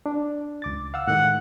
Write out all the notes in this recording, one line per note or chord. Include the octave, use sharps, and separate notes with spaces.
D4
C#2 D6 A6
F5 F#5 E6
A2 D#3 G#3 F#5